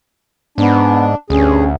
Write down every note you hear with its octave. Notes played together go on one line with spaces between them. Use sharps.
G#2 B3 D4
D2 G2 C#4 G#4